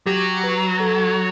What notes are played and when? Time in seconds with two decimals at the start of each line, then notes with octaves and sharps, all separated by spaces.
0.06 F#3 G4
0.43 B4
0.80 A4